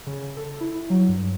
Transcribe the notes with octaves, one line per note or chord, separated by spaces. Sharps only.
C#3
A4
E4
F#3
G2